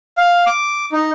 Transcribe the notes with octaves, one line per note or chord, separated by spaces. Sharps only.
F5
D6
D#4